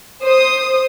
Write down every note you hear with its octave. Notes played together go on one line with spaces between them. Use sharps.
C5 D#6